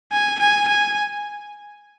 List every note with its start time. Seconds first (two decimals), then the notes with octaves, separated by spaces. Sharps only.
0.12 G#5
0.40 G#5
0.68 G#5